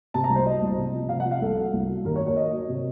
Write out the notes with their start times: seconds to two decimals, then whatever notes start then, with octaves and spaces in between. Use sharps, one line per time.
0.14 C3 A5
0.24 A#5
0.30 C2
0.35 C5
0.45 F#3 D#5
0.62 C2
0.77 C3
0.94 F3
1.09 C3 F5
1.20 F#5
1.25 F3
1.31 F5
1.41 C2 A4
1.57 F#3
1.73 C2
1.89 F#3
2.04 D#2 A#4
2.16 C#5
2.20 D#2
2.27 C#5
2.36 F#3 D#5
2.52 F#3
2.69 C3